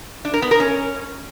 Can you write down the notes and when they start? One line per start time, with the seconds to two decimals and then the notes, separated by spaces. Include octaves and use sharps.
0.25 D4
0.34 A#4
0.42 B3
0.51 A#4
0.60 C#4